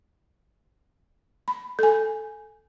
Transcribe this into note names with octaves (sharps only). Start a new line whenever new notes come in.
B5
A4 G#5